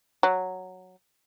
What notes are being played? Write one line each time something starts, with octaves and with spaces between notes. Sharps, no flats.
F#3